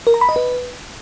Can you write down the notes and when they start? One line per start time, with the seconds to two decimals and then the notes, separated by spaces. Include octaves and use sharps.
0.07 A#4
0.14 A#5
0.21 B5
0.29 D#5
0.36 B4